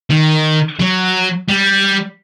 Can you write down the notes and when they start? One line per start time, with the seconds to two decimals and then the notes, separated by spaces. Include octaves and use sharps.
0.11 D#3
0.80 F#3
1.48 G3